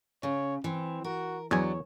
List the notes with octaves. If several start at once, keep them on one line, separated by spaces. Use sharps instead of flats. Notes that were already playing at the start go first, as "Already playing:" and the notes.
C#3 C#5
E3 C4
F#4 A#4
E2 F#3 D4 C#5 G#5